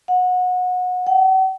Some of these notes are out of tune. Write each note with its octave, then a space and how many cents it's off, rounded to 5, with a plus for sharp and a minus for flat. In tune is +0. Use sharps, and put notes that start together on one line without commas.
F#5 -25
F#5 +45